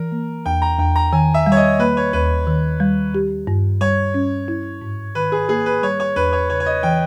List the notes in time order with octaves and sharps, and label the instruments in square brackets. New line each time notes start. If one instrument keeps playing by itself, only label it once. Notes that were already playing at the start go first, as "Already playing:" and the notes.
Already playing: [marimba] E3 [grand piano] A#4
[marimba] A#3
[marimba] E2 [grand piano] G5
[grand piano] A#5
[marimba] E2 [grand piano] G5
[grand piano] A#5
[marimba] D#3 [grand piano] G#5
[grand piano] E5
[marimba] G3
[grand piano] C#5
D#5
[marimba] A#3 [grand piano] B4
[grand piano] C#5
[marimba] D#2 [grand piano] B4
[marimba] D#3
G3
G4
G2
[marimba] G3 [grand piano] C#5
[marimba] C#4
E4
G#2
[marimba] D#3 [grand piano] B4
[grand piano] G#4
[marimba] A#3 [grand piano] G#4
[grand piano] B4
[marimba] G3 [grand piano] C#5
[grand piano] C#5
[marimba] E2 [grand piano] B4
[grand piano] C#5
[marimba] C#3 [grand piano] C#5
[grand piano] C#5
D#5
[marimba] E3 [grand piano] G5